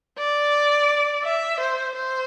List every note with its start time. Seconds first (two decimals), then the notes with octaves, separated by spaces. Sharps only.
0.18 D5
1.24 E5
1.60 C5
1.95 C5